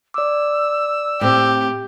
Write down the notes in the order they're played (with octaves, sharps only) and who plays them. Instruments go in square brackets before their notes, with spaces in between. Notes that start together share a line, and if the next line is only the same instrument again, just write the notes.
[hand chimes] D5 D6 [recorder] E6
[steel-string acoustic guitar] A2 C4 [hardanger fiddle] G4